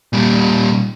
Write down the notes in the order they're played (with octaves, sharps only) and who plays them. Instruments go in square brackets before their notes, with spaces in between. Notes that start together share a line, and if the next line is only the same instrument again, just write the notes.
[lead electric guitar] A#2 G3